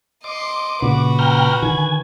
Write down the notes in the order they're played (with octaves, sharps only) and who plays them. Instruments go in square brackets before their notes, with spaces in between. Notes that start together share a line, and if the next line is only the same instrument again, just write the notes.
[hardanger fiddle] D#5 C6 [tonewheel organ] D6
[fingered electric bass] A#2 C#3 [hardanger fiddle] F#4 B4
[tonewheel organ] G5 A#5 F6
[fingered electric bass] D3 D#3 [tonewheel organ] G#5